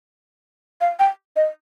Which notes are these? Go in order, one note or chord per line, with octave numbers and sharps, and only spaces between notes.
F5
G5
D#5